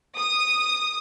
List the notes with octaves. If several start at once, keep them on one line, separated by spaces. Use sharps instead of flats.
D#6